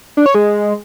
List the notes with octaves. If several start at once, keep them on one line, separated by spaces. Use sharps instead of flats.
D4
C#5
G#3